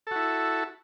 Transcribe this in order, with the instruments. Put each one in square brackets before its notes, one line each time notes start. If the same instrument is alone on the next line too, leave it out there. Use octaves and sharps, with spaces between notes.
[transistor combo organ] A4
F#4
E4